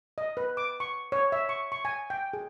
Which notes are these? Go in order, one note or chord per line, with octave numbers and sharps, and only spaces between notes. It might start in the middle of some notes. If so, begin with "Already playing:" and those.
D#5
B4
D6
C#6
C#5
E5
C#6
C#6
G#5
G5
G#4